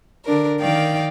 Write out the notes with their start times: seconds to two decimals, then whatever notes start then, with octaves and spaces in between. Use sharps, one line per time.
0.24 D3 D4 A#4
0.59 D#3 D5 F5 G5